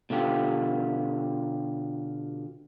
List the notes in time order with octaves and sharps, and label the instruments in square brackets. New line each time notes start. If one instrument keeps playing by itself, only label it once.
[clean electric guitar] B2 D3 F4 G4